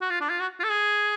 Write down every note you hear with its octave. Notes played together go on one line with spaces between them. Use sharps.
F#4
F4
D4
F4
F#4
F4
A4
G#4